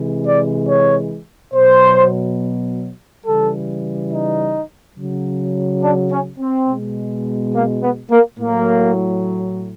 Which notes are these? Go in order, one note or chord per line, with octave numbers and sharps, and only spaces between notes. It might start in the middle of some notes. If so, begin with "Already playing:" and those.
Already playing: C3 E3 G#3
D5
C#5
B2 F#3 C5
C#3 E3 G3 A4
D#4
C#3 F#3
D4
C#4
C4
B2 G#3
A#3
B3
A#3
A2 F#3 A#3